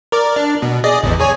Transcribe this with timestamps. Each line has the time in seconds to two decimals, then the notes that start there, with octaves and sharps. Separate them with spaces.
0.12 A#4 D5
0.36 D4
0.62 B2
0.84 G#4 D5 D#5
1.03 A1 E2
1.20 G#4 C#5 G#5